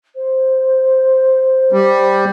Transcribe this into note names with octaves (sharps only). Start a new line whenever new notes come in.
C5
G3